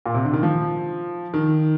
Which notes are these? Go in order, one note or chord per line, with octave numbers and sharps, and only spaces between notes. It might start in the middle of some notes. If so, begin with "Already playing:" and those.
A#2
C3
D3
D#3
F3
D#3